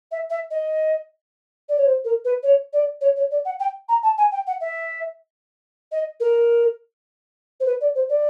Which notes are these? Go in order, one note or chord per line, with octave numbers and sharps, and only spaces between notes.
E5
E5
D#5
D5
C#5
C5
A#4
B4
C#5
D5
C#5
C#5
D5
F#5
G5
A#5
A5
G#5
G5
F#5
E5
D#5
A#4
C5
B4
D5
C5
D5